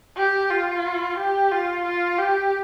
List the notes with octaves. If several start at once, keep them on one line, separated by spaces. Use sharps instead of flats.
G4
F4
G4
F4
F4
G4